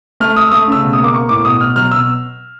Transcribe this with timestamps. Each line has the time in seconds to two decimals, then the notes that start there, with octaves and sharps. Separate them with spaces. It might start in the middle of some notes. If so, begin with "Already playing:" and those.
0.20 A3 F6
0.36 A3 D#6
0.47 E6
0.52 A3 D#6
0.68 C#3 E6
0.83 B2
0.93 D#6
0.98 A#3
1.04 D6
1.13 A#3 C#6
1.29 A2 D6
1.45 B2 D#6
1.60 B2 F6
1.76 F#3 F6
1.91 B2 E6